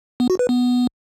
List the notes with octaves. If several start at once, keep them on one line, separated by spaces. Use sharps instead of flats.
B3
F#4
B4
B3